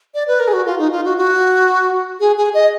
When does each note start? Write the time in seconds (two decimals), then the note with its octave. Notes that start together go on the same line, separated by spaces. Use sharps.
0.14 D5
0.28 B4
0.40 A#4
0.48 G#4
0.53 F#4
0.66 F4
0.78 D#4
0.92 F4
1.04 F#4
1.18 F#4
2.20 G#4
2.37 G#4
2.54 D#5